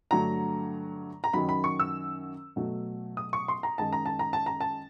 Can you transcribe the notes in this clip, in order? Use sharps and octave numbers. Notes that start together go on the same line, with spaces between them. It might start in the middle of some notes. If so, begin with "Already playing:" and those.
G2 D3 F#3 A3 A#5
A#5
F#2 D#3 F#3 B5
B5
C#6
E6
B2 F#3 A3
D#6
C#6
C6
A#5
F#2 D#3 G#3 A5
A#5
A5
A#5
A5
A#5
A5